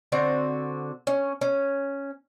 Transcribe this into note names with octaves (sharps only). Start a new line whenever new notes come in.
D3 C4 F#4 F#5
C#4
C#4